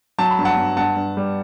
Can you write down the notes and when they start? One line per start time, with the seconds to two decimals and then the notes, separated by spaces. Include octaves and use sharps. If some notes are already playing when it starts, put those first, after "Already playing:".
0.18 F#3 A5
0.31 B5
0.39 G2
0.45 F#5 A5
0.57 G2
0.77 G2 F#5 A5
0.96 G2
1.17 G3